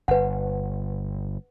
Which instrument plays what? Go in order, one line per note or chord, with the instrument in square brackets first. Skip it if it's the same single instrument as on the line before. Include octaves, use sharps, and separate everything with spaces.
[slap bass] G1 [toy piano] B4 F#5